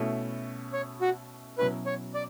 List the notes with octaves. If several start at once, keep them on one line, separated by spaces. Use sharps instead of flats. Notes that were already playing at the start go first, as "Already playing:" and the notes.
Already playing: B2 A3 C#4 E4
C#5
F#4
B2 F#3 C#4 E4 B4
C#5
D5